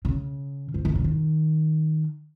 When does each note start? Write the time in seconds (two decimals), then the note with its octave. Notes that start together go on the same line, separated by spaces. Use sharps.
0.05 C#3
0.74 F3
0.85 D#3
0.95 C#3
1.04 D#3